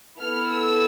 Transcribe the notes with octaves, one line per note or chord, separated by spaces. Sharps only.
B3 E4 A4 F6
E6